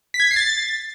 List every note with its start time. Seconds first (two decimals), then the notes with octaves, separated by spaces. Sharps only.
0.14 B6
0.20 G#6
0.25 B6
0.31 C7
0.36 A6